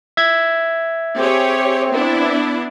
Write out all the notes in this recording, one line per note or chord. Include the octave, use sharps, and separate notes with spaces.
E5 G#6
C4 G4 G#4 C#5
B3 D4 E4